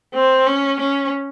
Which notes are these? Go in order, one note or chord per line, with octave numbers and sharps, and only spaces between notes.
C4
C#4
C#4